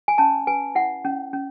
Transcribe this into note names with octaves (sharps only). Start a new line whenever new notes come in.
G#5
C#4 A5
B4 G#5
E4 F#5
C#4
C#4